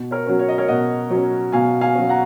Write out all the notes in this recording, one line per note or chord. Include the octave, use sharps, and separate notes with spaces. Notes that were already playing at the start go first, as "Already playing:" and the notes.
Already playing: B2
A#4 C#5
F#3 C#4
C#5
D#5
A#4 C#5
B2 D#5 F#5
F#3 C#4
B2 F5 G#5
F5 G#5
F#3 C#4
F#5 A#5